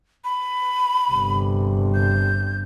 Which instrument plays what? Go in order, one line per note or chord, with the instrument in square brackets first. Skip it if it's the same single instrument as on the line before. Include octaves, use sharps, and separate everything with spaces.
[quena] B5
[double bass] G1 C3
[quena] G6